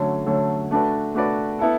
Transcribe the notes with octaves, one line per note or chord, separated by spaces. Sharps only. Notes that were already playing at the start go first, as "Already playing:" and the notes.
Already playing: D3 F#3 A3 C#4
D3 F#3 A3 C#4
A3 D4 F#4 B4 D5
A3 D4 F#4 B4 D5
B3 E4 A4